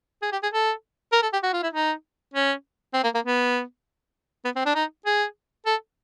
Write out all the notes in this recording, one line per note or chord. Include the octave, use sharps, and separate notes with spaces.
G#4
G4
G#4
A4
A#4
A4
G4
F#4
F4
E4
D#4
C#4
C4
A#3
A#3
B3
B3
C4
D4
D#4
G#4
A4